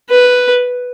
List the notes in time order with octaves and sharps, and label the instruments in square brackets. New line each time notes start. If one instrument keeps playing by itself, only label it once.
[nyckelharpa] B4